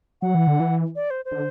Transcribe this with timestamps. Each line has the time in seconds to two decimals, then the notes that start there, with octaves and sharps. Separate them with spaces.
0.22 F#3 F#5
0.35 E3
0.47 D3
0.60 E3
0.96 D5
1.10 C5
1.25 C5
1.32 D3